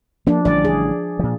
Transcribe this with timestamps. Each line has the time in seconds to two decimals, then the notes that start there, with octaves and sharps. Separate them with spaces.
0.27 F3 A#3 D4
0.45 A1 D3 G3 D5
0.65 G#4
1.19 A#2 F3